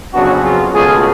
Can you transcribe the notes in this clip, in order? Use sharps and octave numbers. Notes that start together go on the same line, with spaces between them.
F2 C#3 F#3 B3 D4 F#4
F4 G#4
C#2 B2 A3 F4 G#4